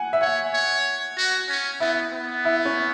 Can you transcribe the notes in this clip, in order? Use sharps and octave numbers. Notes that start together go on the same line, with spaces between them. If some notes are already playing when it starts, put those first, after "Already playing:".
Already playing: F#5 G#5
E5
C#5 F#5
C#5
F#4
C#4
B3 E4
B3
E4
C#4